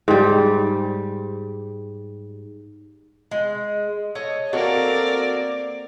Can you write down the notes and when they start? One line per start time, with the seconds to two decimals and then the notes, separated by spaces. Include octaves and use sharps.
0.08 G#2 G3
3.31 G#3
4.15 A4 C#5 D#5
4.53 A#3 C4 F#4 A4 A#4 D5